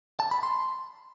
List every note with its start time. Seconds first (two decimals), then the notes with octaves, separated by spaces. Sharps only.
0.20 A5
0.31 B5
0.43 C6